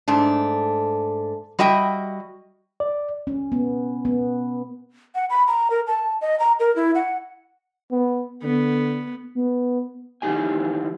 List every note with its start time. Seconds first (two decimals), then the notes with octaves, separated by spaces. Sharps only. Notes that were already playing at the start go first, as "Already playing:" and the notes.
0.08 G#2 A3 D4
1.59 G3 F#4 D#5 E5 G5
2.80 D5
3.27 C#4
3.52 B3
4.05 B3
5.15 F#5
5.30 B5
5.47 A#5
5.70 A#4
5.87 A5
6.21 D#5
6.40 A#5
6.60 A#4
6.76 E4
6.95 F#5
7.92 B3
8.43 D3 B3
9.35 B3
10.22 D#3 E3 F#3 D#4 G4 G#5